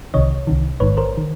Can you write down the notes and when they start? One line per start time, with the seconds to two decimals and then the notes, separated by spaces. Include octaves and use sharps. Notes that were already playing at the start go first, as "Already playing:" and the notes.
0.14 C2 C3 D#3 C#5 D#5
0.47 C2 C3 D#3
0.80 A1 G#2 D#3 B4 C#5
0.97 A#4 C5
1.17 D#3